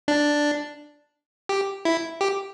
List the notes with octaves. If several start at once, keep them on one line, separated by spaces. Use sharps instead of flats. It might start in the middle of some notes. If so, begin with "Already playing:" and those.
D4
G4
E4
G4